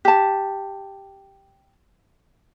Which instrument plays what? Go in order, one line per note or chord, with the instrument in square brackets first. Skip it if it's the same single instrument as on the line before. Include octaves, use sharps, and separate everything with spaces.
[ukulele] G4 A5